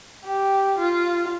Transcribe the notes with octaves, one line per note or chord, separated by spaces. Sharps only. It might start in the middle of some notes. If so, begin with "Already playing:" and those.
G4
F4